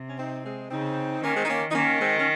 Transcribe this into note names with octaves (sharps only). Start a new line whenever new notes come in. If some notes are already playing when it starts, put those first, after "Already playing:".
Already playing: C3
C#4
C4 D#4
G#3 C4
C#3 C4 D#4
D#3 A#3 C#4
G#3 C4
D#4
A#3 C#4
D#4
D#3 A#3 C#4
G#3 C4
C#4